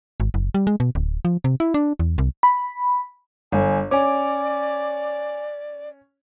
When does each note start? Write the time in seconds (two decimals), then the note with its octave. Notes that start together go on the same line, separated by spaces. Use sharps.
0.20 G#1
0.34 F#1
0.54 G3
0.67 G#3
0.80 B2
0.95 D1
1.25 F3
1.44 C3
1.60 E4
1.74 D4
1.99 E2
2.18 C2
2.43 B5
3.52 G1 G#5
3.91 C#4 D5 G#5 D6